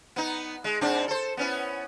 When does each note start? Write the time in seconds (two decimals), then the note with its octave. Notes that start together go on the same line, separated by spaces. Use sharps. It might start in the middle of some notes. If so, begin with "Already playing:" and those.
0.16 B3 D#4
0.64 G#3
0.81 G#2 C4 D4
1.08 A4 C5
1.37 B3 C#4 E4